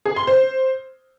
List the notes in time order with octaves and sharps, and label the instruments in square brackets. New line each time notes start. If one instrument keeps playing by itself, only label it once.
[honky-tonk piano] G#4
C6
C5